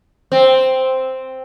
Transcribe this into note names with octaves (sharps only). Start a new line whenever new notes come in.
C4